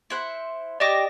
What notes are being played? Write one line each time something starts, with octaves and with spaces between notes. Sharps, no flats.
E4 C5 F#5
G4 D5 D#5 G5 D6 A#6